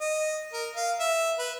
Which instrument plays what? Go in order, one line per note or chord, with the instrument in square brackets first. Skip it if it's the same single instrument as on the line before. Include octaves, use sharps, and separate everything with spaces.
[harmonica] D#5
A#4
F5
E5
B4